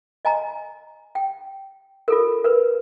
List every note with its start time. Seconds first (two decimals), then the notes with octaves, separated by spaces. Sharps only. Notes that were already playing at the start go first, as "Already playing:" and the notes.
0.25 D#5 G#5 A#5
1.15 G5
2.08 F4 A4 A#4
2.45 A#4 B4